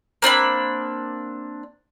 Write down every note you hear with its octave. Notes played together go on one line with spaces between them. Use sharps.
A#3 C4 D4 B5